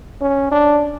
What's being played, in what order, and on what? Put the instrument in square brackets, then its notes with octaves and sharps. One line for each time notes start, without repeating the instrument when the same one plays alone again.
[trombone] C#4
D4